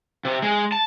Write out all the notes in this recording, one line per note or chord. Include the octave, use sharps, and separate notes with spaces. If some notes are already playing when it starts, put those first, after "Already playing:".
C3
G#3
A5